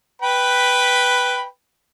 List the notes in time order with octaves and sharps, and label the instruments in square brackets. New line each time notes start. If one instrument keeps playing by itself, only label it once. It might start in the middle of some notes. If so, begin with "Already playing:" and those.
[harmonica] B4 G5 B5